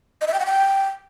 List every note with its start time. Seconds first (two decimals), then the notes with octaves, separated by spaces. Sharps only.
0.21 D#5
0.27 E5
0.34 G5
0.40 F#5
0.46 G5